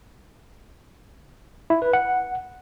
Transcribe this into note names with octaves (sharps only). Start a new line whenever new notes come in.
E4
B4
F#5